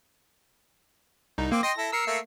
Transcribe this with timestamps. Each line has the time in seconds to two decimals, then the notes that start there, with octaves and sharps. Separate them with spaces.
1.38 C2 D#4
1.52 A#3 C4 D6
1.63 D#5 G5 C6 A#6
1.78 E4 A4
1.92 A#4 E6 C7 C#7
2.07 A3 A#3